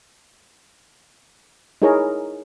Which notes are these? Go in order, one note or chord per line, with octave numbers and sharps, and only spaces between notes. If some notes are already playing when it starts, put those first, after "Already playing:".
D#4 E4 G#4 A#4 C#5 A#5